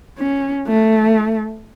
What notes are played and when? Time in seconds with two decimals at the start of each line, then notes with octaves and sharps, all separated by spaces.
0.18 C#4
0.67 A3